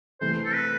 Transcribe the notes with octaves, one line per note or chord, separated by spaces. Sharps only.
C3 E3 A3 C5
A4
B4